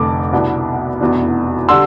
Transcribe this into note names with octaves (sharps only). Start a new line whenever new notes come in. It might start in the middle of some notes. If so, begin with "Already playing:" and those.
Already playing: F1 F2 D3 A3 D6
C2 B2 B3 D4
F1 E2 B2 B3 D4
D3 G3 D4 C6 E6